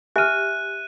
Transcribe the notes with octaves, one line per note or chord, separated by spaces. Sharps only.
G4 E5 G#5 F6 F#6 D#7